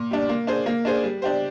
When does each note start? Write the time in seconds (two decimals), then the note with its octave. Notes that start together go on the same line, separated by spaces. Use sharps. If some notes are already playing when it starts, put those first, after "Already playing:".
Already playing: A#2
0.11 G3 D4
0.29 A#3
0.47 D4 G#4 C5
0.66 A#3
0.85 D4 G#4 C5
1.03 G3
1.22 D4 G4 C5